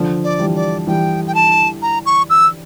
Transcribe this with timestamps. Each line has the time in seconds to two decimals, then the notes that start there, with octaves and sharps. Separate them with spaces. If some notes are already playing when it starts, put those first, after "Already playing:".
Already playing: D3 F3
0.24 D5
0.39 E3 G3
0.55 D5
0.87 E3 G3 G5
1.27 G5
1.35 A5
1.82 A#5
2.06 C#6
2.30 E6